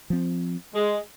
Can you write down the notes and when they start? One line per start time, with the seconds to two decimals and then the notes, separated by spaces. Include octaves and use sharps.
0.10 F3 C4
0.74 G#3